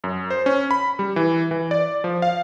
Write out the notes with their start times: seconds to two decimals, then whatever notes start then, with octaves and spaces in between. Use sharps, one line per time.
0.04 F#2
0.30 C5
0.46 C#4
0.71 B5
0.99 G3
1.16 E3
1.51 E3
1.71 D5
2.04 F3
2.22 F5